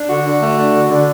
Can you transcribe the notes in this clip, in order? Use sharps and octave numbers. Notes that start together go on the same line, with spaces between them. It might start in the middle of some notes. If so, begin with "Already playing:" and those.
Already playing: D4
D3 F#4
D3
A3
D4
D3
D3